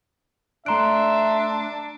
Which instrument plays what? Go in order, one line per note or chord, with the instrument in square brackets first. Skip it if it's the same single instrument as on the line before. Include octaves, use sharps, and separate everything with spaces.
[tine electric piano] A3 C6 F#6 [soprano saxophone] D4 [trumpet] E5 [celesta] A#5 D7